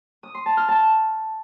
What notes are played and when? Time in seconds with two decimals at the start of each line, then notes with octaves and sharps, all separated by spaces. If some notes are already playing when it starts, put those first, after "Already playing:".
0.23 D#6
0.35 C6
0.46 A5
0.57 F6
0.68 A5